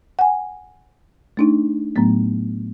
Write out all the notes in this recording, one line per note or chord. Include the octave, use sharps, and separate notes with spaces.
F#5 G#5
A3 D4 D#4
A2 F#3 A3 B3